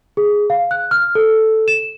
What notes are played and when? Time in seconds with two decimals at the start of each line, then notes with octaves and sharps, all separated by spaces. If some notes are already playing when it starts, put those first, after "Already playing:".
0.17 G#4
0.50 F5
0.71 F#6
0.91 F6
1.15 A4
1.68 E7